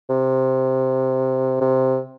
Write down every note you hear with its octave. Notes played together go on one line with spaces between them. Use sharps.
C3
C3